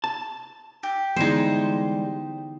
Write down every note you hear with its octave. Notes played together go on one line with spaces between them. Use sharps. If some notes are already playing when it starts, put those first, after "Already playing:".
A5
G4
D3 E3 G3 G#3 B3 D#4 E4 C5